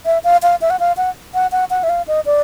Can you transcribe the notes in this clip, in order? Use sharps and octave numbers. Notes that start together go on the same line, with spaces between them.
E5
F5
F5
E5
F#5
F5
F#5
F#5
F#5
F#5
E5
F5
D#5
D5